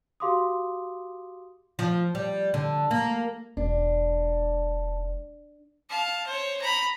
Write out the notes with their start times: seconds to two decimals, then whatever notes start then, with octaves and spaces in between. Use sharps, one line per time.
0.20 F#4 G4 F5 C6 D6 D#6
1.79 F3
2.15 G3
2.54 D3
2.91 A#3
3.57 E1 D4
5.90 F5 A5
6.27 C5 C#5
6.61 A#5 B5